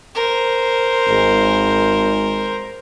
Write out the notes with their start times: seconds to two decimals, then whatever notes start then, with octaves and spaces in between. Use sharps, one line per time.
0.15 A#4 C5
1.07 G#1 G#3